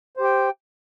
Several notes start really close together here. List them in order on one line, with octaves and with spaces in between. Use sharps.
C5 G4 G5